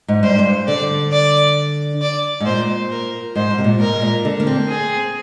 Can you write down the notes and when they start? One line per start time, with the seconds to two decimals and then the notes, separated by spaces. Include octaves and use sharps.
0.08 G#2
0.23 G2 C5
0.39 G2
0.68 D3 D5
1.12 D5
2.01 D5
2.40 G#2
2.46 A#2 C5
2.91 A#4
3.35 G#2 C5
3.51 G#2
3.58 C3
3.64 A#2
3.80 G#2 A#4
3.92 G#2
4.02 A#2
4.25 D3
4.40 A#3
4.47 C4
4.69 G#4